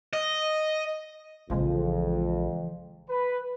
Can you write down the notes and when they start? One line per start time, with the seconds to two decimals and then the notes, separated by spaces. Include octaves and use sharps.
0.13 D#5
1.50 A#1 F2 C#3 E3 F3 G#3
3.09 B4